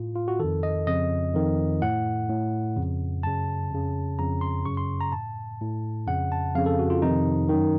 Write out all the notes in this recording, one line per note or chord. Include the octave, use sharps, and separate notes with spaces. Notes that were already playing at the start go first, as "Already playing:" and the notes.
Already playing: A2 F4
F4
F#4
F2 D#3 A4
D#5
F2 C#3 D#5
F2 D#3
A2 F#5
A2
F2 C#3
F#2 C#3 A5
F2 C#3
F2 C#3 A#5
C6
F#2 C#3 C#6
C6
A#5
A2 A5
A2
F2 C#3 F#5
A5
F2 C#3 F5
A4
F#4
F4
F2 C3 D#3 D#4
F#2 D#3